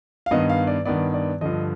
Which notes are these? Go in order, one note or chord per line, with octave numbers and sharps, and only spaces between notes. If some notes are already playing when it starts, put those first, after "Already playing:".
F5
G2 D#3 B3 D#5
F5
D5
G2 D#3 B3 D5
D5
G2 D3 F3 D#5